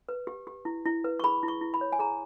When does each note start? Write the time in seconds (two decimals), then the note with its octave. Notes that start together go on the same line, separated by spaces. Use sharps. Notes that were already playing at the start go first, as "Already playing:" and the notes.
0.09 B4
0.27 G4
0.47 G4
0.65 E4
0.85 E4
1.04 B4
1.20 C#6
1.23 G#4 B5
1.43 E4
1.48 C#6
1.61 E4
1.74 B5
1.81 C#5
1.92 G#5
1.99 G#4 A#5